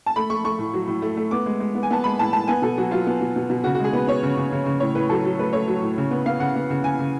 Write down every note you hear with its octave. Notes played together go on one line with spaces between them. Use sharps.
A5
A3 B5
A3 C#6
A3 C#6
A2
F#3
A2
A3
A3
B3 D6
G#3
G#3
B3
G#5
B3 A5
G#3 B5
A2 A5
G#3 A5
B3 G#5
B2 A4
F#3 F#4
F#3 F4
B3
B2
B2
B2
C#3 F#4
F#4
G#3 G#4
B3 B4
B3 C#5
C#3
C#3
C#3
C#3
A2 C#5
A2 B4
F#3 A4
F#3
A3 B4
A3 C#5
F#3
A2
C#3
B3
B3 F5
C#3 F#5
B3
C#3
C#3 G#5
C#3